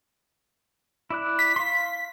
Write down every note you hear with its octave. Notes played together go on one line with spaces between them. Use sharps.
E4 D5 F#6
B6
F5 C6